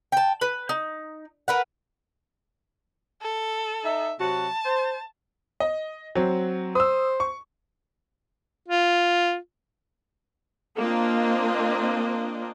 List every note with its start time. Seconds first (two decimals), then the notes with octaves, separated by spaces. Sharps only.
0.12 G5 A5
0.41 B4
0.69 D#4
1.48 A#4 B4 F#5
3.21 A4
3.84 D#4 E5
4.20 C3 F#3 F#4 A5
4.65 C5
5.60 D#5
6.16 F#3 C4
6.75 C5 D#6 E6
7.20 C#6
8.68 F4
10.77 A#3 C4 D4 F4 D#5